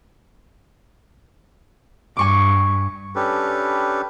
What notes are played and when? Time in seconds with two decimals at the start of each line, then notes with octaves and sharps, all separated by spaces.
2.17 G2 G#5 C#6 D6
3.15 C#4 D4 G4 A4 B4